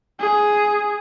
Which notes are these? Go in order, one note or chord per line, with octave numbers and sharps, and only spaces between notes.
G#4